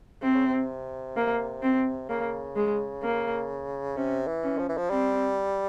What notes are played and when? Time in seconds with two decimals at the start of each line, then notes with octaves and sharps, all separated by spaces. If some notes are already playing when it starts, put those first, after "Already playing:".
0.22 C3 C4
0.35 C#3
0.45 C3
1.17 A#3
1.62 C4
2.09 C#3 A#3
2.56 G#3
3.03 A#3
3.96 C3 C#4
4.28 E3
4.43 C#4
4.59 F3
4.69 E3
4.78 F3
4.89 G3 C4